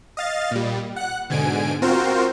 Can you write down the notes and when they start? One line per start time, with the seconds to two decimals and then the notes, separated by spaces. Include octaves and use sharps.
0.17 D#5 F5 A6
0.51 A#2 G3
0.96 F#5 F#6
1.30 G#2 B2 D3 G#5 D7
1.82 C4 F4 F#4 A#4 C5